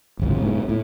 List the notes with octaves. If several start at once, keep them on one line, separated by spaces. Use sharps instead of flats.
D1 G#1 C#2
G#2 B2
A2